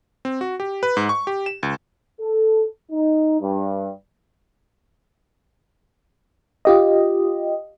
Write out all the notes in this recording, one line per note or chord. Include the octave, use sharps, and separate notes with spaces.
C4
F#4
G4
B4
G#2
C#6
G4
E7
C#2
A4
D#4
G2
F4 G4 D#5